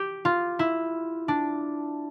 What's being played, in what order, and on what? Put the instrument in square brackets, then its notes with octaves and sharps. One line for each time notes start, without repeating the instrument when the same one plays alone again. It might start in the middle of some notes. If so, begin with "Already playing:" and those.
Already playing: [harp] G4
F4
E4
D4